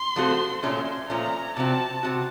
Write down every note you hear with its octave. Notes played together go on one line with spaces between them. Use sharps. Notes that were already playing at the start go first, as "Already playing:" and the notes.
Already playing: C6
F3 A3 C4 F#4 A4
A#2 F3 A3 C#4 C6
A#2 F3 A3 C#4 A#5
C3 F3 C4 F#4 A5
C3 F3 C4 F#4